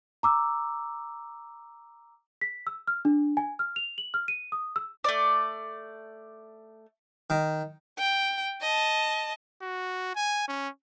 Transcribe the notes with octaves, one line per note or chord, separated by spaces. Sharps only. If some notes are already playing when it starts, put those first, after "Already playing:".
A#5 D6 E6
B6
E6
F6
D4
G#5
F6
F7
F#7
F6
D#7
D#6
E6
A3 D5
D#3
G5
D#5 A5
F#4
G#5
C#4